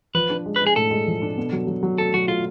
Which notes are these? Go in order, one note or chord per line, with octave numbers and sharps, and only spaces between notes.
F3 B4
D4
G#3
B4
G#3
G#4
A2 A4
G#3
F3
D4
B2
F#3
F#3
F#3
A3 A4
F#3 F#4
A3 F4